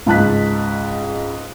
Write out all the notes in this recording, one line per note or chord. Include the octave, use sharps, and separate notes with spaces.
C#2 G#2 A5 F#6 B6